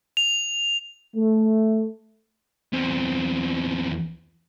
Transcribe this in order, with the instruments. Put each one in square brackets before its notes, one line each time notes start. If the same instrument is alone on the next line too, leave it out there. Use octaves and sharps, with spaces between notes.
[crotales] F7
[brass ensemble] A3
[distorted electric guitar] E2 C4